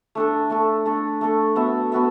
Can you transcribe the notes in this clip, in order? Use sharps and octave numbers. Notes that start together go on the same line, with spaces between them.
A3 D4 A4
A3 D4 A4
A3 D4 A4
A3 D4 A4
B3 F#4 A4 E5
B3 F#4 A4 E5